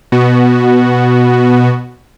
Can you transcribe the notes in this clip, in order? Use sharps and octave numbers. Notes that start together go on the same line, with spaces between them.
B2 B3 F#4